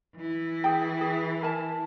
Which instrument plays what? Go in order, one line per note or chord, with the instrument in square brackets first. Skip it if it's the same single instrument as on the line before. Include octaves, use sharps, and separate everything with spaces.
[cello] E3 E4
[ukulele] G#4 G5
G#4
A#4 G#5 A5